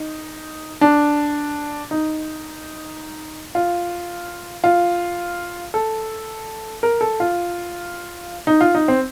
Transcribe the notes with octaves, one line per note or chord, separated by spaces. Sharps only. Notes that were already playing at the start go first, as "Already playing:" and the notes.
Already playing: D#4
D4
D#4
F4
F4
A4
A#4
A4
F4
D#4
F4
D#4
C4